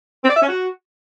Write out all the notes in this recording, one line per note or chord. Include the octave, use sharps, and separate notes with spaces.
C4
D5
E5
C#4
F#4